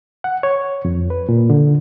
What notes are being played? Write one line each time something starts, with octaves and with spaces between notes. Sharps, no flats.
F#5
C#5
F2
B4
A#2
D3